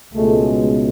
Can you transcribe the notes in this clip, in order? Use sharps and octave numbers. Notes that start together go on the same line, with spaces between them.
C#2 B2 G#3 A3